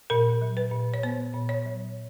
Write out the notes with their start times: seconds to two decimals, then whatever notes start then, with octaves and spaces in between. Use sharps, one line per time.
0.10 A#2 A#4
0.42 F#3
0.57 B4
0.72 A#2
0.94 C#5
1.03 B3 C5
1.34 A#2
1.49 C#5
1.66 F#3